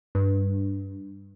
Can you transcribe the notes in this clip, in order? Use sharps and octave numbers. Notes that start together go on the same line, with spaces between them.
G2